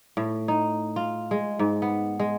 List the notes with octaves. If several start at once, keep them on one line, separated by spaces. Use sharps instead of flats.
A2
D#4
F4
G#3
G#2
B3
G#3